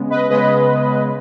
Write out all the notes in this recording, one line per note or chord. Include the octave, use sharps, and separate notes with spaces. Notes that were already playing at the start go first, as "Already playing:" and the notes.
Already playing: C#3 G#3 B3
B4 D#5
C#3 G#3 B3 B4 D#5